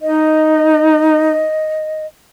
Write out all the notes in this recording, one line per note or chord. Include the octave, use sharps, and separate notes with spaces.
D#4 D#5